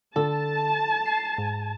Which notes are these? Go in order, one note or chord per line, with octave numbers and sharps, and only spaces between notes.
D3 A4 A5
C7
G#2